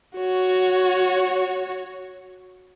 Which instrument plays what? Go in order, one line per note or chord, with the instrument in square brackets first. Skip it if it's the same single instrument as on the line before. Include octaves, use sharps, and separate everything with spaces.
[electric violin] F#4 C#5